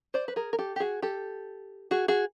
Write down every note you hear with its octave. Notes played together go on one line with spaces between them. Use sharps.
C5 D5
B4
G#4 A#4
A#4
G4 A4
G4
F#4 G#4
G4 A4
F#4 G#4
F#4 G#4